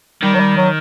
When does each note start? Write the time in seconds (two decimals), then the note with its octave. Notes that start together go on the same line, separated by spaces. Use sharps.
0.23 D#3 G3
0.35 F#3
0.40 G3
0.57 F#3